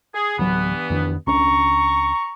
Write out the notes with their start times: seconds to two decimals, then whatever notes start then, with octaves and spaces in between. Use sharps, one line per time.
0.14 G#4
0.39 D1 G2 E3 F#3 B3
0.90 F2 D#3 D4
1.27 C#2 C#4 D4 A#5 C#6